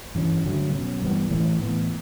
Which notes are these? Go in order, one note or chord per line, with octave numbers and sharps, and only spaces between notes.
G2 E3 G3 C#4
G2 D3 F#3 A3
B2 F#3 C#4
G2 E3 G3 B3
A2 E3 A3 C#4
A2 E3 B3